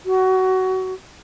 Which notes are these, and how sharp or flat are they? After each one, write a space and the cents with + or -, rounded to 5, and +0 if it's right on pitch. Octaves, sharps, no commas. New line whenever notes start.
F#4 +20